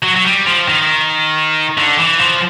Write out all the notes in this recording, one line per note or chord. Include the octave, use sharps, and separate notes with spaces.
F#3
F#3
G3
F3
D#3
D3
E3
F3